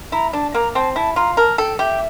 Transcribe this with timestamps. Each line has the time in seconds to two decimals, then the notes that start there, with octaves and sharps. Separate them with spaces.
0.12 E4 A#5
0.33 D4 A5
0.54 A#3 A#5
0.75 C4 A5
0.96 E4 A5
1.16 F4 A#5
1.37 A#4 A5
1.58 A4 G5
1.79 G4 E5